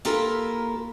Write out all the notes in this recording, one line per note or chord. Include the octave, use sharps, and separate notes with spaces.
A#3 E4 F4 G4 A4 A#4